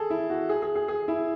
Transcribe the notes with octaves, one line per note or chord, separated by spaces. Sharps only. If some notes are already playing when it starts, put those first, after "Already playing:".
Already playing: G#4 A4
E4
F#4
G#4
G#4
G#4
G#4
E4